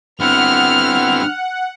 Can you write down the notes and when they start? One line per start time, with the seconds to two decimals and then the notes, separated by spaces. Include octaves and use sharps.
0.21 D3 B3 C4 E4 F#5 F6 F7